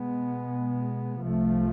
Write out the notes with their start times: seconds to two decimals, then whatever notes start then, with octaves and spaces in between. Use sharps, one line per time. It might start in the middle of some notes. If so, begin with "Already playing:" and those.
Already playing: B2 G#3 B3
1.21 C2 C3 F3 A3